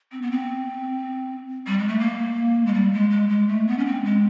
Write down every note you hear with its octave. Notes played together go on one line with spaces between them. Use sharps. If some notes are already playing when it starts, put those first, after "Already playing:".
C4
B3
C4
G3
G#3
A3
A#3
G#3
G3
G#3
G#3
G#3
A3
B3
C#4
C4
G#3